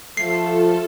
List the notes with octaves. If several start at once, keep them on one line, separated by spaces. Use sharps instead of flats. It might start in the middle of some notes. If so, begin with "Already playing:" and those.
F3 A3 F4 A4 C7